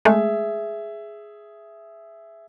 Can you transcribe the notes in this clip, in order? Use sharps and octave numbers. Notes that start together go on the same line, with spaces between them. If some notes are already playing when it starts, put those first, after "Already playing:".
G#3 A3 G#4 E5